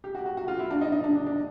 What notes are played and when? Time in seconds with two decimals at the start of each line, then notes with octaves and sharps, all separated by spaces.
0.04 G4
0.15 F#4
0.26 F#4
0.37 F#4
0.48 F4
0.59 E4
0.71 D4
0.81 D#4
0.92 D#4
1.04 D4
1.15 D4
1.26 D4